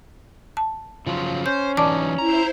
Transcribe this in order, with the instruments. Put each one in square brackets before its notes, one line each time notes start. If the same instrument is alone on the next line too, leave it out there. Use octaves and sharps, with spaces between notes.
[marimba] A5
[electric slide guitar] C#3 F3 F#3 [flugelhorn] F4
[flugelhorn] C#4 [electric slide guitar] C5 [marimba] G6
[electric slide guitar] E3 F#3 D#4 [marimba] D5 A5 D6
[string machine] E4 C5 [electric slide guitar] A#5